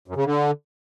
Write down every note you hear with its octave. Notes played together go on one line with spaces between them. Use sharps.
F#2
C#3
D3